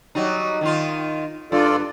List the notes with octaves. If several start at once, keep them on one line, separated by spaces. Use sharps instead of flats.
F#3 G3 D#4
D#3 D#4 F4
G2 F4 A4 D5